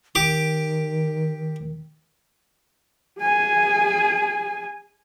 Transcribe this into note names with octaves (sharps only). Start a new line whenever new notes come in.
D#3 G4 D6
G#4 G#5